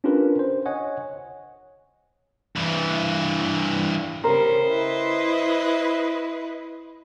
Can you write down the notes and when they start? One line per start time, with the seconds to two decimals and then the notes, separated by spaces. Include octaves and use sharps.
0.04 C#4 D4 F4 G4 A#4 B4
0.39 C5
0.66 C#5 D#5 F#5 G#5
2.56 G2 E3
4.24 C#3 G3 A#4 C5
4.68 E4 B4 D#5